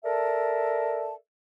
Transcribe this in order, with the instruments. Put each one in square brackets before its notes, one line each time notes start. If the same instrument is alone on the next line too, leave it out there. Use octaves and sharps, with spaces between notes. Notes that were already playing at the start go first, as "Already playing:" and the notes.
[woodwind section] A4 A#4 D5 E5 A5